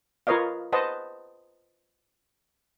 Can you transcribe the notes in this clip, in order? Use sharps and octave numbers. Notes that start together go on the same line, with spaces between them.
F4 A#4 B4 C#5 D#5 F5
B4 C5 D#5 F#5 A5